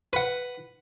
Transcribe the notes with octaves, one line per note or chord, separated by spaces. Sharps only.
B4 F#5